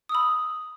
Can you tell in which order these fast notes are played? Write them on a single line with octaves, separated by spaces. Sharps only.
D#6 E6 B5